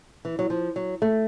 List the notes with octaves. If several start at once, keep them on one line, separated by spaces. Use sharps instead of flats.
E3
F#3
F3
F#3
A3